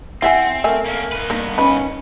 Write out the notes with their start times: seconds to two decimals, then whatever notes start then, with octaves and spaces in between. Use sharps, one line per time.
0.22 C4 E4 E5 F#5 G#5
0.64 A3 A#4 E5 G#5
0.86 A#3 C#4
1.12 D#4 B4
1.30 G2 A#3 B3 D#4
1.58 D#3 C#4 B4 B5